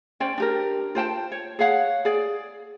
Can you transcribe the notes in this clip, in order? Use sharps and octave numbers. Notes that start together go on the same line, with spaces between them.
C#4 C5 D5 G5
D4 G4 A#4
F4 C5 G5 A5
C#5
G#4 C#5 F5 F#5
G#4 D5